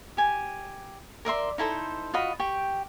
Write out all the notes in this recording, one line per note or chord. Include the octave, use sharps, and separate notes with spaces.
G4 G#5
A#4 D5 E5 C6
D#4 E4 A4 C5
F4 F#4 D#5 B5
G4 G5 C#6